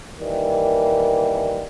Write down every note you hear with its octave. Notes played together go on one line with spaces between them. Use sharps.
D#3 E3 G3 A#3